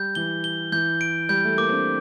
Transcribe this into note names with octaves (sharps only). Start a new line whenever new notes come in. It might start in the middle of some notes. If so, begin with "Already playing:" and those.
Already playing: G3 G6
E3 G7
G7
E3 G6
D7
G3 G6
A3
A#3 D6
C4
D4